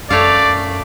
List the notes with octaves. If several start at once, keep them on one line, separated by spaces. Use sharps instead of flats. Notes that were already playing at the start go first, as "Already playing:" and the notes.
F#2 A3 C#5 D5 F5